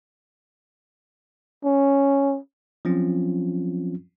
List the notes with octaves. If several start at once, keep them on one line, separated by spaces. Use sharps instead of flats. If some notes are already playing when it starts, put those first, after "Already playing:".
C#4
F3 F#3 C4 C#4 F4